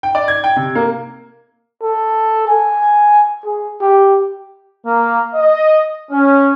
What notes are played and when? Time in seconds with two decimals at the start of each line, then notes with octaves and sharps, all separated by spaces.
0.03 G5
0.15 D5
0.28 G#6
0.44 G5
0.56 C3
0.75 A#3
1.83 A4
2.48 G#5
3.45 G#4
3.81 G4
4.85 A#3
5.34 D#5
6.10 C#4